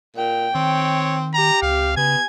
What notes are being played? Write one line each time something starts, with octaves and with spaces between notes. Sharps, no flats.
A#2 G5
D#3 C4 C#5
G4 A#5
C#2 C3 F5
C#3 B3 G#5 G#6